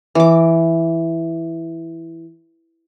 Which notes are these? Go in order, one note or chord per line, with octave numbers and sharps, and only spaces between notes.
E3 D6